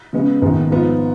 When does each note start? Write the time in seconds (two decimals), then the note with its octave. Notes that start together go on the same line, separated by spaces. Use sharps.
0.13 C#3 G#3 B3
0.42 A#1 G#2 D#3 G#3 B3
0.71 G#2 F3 B3 F4